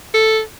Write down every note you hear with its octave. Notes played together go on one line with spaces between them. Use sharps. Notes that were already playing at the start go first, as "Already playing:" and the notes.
A4